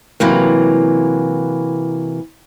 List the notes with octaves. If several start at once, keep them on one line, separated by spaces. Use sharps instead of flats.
C3 E3 F#3 A#3